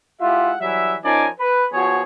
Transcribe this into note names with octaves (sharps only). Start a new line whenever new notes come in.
G#3 E4 F4 G4 E5 F#5
E3 F#3 G3 E5
F3 C#4 D#4 A#4 D5 G#5
B4
F3 B3 F#4 G#4 C#5